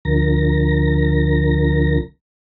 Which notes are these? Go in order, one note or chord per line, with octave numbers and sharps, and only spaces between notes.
D2 D3 F3 A#4 A#6